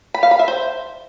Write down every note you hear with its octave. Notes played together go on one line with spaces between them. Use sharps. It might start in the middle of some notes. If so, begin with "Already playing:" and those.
B5
F5
B5
E5
C5